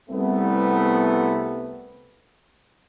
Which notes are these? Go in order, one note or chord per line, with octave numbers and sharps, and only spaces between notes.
C2 A3 B3